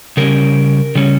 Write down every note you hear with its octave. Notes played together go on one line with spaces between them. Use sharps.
C#3 G3 C#4 A#4
C#3 G3 C#4